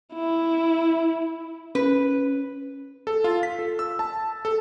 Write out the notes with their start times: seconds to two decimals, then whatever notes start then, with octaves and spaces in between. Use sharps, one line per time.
0.14 E4
1.75 C#4 B4
3.07 A4
3.24 F4
3.43 B6
3.59 A4
3.79 E6
3.99 A5
4.45 A4